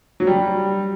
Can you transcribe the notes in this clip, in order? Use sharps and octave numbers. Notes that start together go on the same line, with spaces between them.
F#3
G3